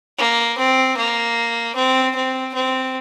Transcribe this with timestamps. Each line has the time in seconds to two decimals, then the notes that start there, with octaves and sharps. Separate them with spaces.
0.18 A#3
0.58 C4
0.97 A#3
1.75 C4
2.15 C4
2.54 C4